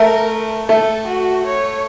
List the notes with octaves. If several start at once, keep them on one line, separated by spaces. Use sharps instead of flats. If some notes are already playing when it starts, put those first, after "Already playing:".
Already playing: A3 A#4
A3 A4
F#4
C#5